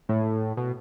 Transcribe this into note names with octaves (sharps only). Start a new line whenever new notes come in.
A2
B2